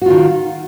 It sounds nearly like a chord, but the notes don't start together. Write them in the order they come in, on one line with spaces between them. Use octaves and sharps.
F#4 F4 D#3